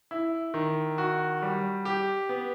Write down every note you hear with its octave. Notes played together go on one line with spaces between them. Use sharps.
E4
D#3
F#4
G3
G4
B3